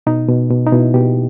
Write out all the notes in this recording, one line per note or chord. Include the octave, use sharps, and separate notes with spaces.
B2 D#4
B2
B2
D#4
B2 E4
B2 G4